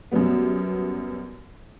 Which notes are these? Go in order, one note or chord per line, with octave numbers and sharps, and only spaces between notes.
F#2 B2 F#3 G3 B3